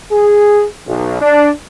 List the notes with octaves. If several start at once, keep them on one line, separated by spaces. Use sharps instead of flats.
G#4
B1
D4